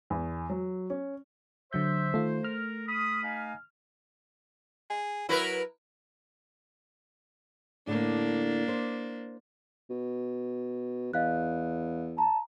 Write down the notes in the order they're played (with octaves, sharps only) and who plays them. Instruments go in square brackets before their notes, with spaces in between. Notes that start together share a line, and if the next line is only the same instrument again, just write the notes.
[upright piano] E2
F#3
C#4
[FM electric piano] D3 F#3 G6 [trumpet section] C5 [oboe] E5
[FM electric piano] D#3 F4 [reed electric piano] A3
[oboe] A#4 [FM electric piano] F6
[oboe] B5 [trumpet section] D#6
[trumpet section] D#4 F5 G#5
[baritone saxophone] G#4
[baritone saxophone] F#3 [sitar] E4 A#4 B4
[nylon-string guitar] A2 D3 [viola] A#3 D4
[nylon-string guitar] C5
[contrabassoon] B2
[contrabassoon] E2 [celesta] D#5 F5 F#6
[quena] A5 [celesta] A#5